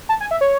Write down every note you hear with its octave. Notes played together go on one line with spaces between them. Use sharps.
A5
G#5
E5
C#5